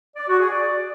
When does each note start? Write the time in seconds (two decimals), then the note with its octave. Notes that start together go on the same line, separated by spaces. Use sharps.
0.16 D5
0.28 F#4
0.40 G#4
0.51 D5